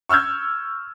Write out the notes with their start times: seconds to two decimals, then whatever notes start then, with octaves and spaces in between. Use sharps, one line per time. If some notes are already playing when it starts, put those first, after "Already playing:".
0.09 C#6 E6 F6 G6 G#6